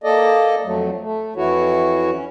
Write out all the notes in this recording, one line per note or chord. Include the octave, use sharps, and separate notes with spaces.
A#3 A4 D5 D#5
F2 F#3 A3
A3
F2 E3 E4 F#4 C#5
C#4